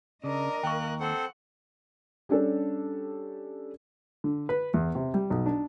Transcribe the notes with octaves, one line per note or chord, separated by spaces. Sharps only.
C#3 D4 A#4 D#5
D#2 A#3 G5 C#6 F#6
C4 A4 C5 F#5
G3 C#4 D4 G4 A4
D3
B4
E2
C3
G3
B1
D4